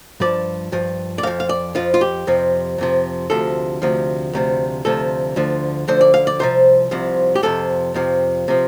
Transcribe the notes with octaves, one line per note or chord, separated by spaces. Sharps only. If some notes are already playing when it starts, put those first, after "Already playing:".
G2 F3 D5
G2 F3
D5
F2 F3 F5
F5
D5
F2 F3 F4
F4
G4
F2 C3 F3
F2 C3 F3
D2 C3 F3 A4
D2 C3 F3
D2 C3 F3
D2 C3 F3 A4
D2 D3 F3
D2 D3 F3 C5
D5
F5
D5
C2 C3 F3 C5
C2 C3 F3
G4
F2 C3 F3 A4
F2 C3 F3
C3 F3